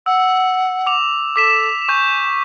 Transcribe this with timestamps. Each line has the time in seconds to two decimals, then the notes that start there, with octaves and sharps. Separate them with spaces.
0.06 F#5 E6
0.87 D6 F7
1.36 A4 D6 B6 E7
1.89 G#5 C#6 G6